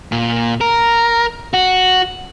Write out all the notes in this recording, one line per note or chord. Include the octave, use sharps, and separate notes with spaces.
A#2
A#4
F#4